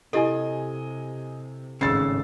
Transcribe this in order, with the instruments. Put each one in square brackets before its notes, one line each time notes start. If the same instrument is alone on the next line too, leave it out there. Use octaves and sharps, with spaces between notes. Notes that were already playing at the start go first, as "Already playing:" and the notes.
[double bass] C3 [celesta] E4 G4 A4 [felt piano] D#5 G#5
[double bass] G#1 A2 [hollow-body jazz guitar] C#3 [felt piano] E6 A6 C7